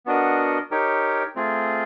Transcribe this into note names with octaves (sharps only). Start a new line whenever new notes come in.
B3 D4 F#4 A#4 D#5
D#4 G4 A#4 C#5
A3 C4 F4 G#4